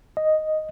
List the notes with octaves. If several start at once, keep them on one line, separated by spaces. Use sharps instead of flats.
D#5